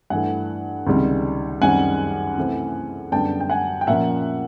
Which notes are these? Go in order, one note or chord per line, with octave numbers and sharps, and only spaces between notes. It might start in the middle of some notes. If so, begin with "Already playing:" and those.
G2 E3 A3 F#5 G#5
C#2 C3 D#3 G3
F#2 D#3 G3 C4 F#5 G#5
C3 E3 A3 C4
F#2 D3 G3 B3 D4 G5 A5
G5
F#5 G#5
G5
A#2 F3 A#3 C#4 E5 F#5